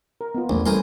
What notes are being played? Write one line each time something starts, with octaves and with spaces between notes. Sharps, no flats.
A#4
B3 F4
A#1 E2 A3 D4
A1 G3 E4 A#4 C5 G#5 C6